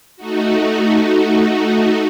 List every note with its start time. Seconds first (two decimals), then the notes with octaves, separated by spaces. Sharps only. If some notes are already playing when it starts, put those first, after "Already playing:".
0.16 A3 D#4 F#4